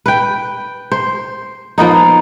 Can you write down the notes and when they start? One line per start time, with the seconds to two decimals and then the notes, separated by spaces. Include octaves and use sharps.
0.06 B4 G5
0.92 C5
1.78 F3 A#3 B3 D#4